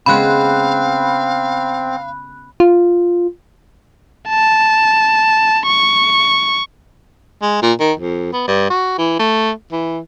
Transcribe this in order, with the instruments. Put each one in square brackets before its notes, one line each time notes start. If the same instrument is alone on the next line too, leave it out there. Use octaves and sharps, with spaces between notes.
[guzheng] C#3 G#3 B3 [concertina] C4 [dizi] F5 [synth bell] B5 F#6
[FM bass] F4
[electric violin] A5
C#6
[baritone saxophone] G#3
A#2
D#3
F2
B3
G2
F#4
E3
A3
E3